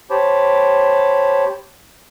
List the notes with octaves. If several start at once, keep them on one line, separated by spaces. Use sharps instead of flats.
G4 C5 C#5 A5 B5 D6